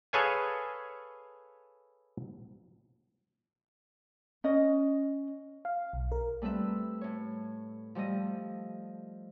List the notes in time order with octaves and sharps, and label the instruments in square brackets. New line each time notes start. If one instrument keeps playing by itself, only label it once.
[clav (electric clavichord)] G#4 A4 B4 C#5 F5 G#5
[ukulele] C#4 D#5
[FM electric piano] F5
B1
A#4
[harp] G3 A3 C4 B4 E5
A2 C#5
F3 G3 A3 D#5